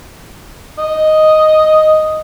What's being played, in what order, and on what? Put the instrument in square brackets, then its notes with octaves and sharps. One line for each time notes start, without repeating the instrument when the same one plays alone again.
[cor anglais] D#5